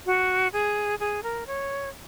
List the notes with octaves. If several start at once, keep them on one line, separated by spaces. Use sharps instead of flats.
F#4
G#4
G#4
A#4
C#5